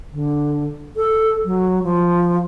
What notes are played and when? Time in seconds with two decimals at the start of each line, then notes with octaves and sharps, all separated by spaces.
0.12 D3
0.96 A4
1.45 F#3
1.84 F3